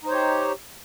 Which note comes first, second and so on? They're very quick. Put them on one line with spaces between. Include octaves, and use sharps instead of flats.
D#4 C5 C#5 G4